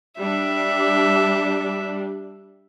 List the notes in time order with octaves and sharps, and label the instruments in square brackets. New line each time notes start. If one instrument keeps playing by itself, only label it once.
[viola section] G3 D4 [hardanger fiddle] E5